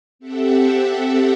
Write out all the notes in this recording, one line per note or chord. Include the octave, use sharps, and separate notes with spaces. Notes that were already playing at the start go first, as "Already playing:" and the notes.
C4 G4 A4 E5 F#5